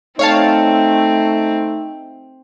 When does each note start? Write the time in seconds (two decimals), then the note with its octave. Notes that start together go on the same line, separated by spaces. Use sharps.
0.19 A3 C4 D#4 C#5 F5 A5